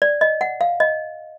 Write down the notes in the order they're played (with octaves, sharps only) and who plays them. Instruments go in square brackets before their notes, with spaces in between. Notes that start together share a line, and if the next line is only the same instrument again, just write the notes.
[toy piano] D5
D#5
F#5
F5
D#5